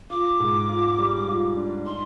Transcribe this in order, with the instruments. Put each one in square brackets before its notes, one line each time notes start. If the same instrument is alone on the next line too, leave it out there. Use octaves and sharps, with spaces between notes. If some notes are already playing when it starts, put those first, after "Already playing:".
[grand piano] F4 [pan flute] D6
[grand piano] G#2
F4
G3
F4
D4
[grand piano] D#4 [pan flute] C6